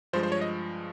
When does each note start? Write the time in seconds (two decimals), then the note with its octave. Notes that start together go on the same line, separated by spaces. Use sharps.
0.13 G2 F3 G#3 C5
0.23 C5
0.32 C#5
0.41 D#5